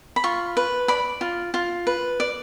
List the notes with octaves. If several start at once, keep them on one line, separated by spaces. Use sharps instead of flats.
B5
F4 C#6
B4
D5 B5
F4
F4
B4
D5